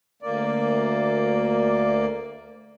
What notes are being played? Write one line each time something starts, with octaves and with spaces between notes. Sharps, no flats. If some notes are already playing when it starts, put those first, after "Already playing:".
D2 A#3 D5